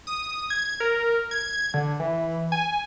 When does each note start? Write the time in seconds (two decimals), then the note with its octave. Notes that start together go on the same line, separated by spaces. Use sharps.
0.07 D#6
0.50 G#6
0.80 A#4
1.31 G#6
1.74 D3
2.00 E3
2.52 G#5